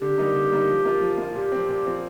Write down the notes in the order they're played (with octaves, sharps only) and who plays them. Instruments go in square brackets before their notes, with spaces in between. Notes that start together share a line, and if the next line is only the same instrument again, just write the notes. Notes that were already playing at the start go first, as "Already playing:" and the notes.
[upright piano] D3 [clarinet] G4
[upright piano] G3 A#3 D#4
D3
G3 A#3 D#4
F3
A#3 F4
F3
A#3 F4
[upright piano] A#2 [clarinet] G4
[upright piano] F3 C4
A#2
F3 C4